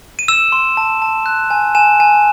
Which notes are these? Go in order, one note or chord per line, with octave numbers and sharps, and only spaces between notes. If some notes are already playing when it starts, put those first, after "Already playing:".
D#7
E6 E7
C6
A5
A5
F#6
G#5
G#5 E7
G#5